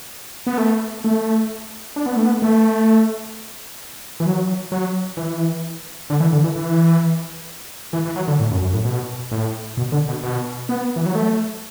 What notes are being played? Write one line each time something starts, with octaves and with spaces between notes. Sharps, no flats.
B3
A3
A3
D4
B3
A3
B3
A3
E3
F#3
F#3
E3
D3
E3
D3
E3
E3
E3
E3
F#3
D3
A2
F#2
F#2
A2
B2
A2
B2
D3
B2
B2
B3
E3
F#3
A3